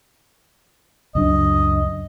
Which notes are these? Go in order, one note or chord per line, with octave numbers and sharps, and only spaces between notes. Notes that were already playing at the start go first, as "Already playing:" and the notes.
C#2 F#2 D4 D#5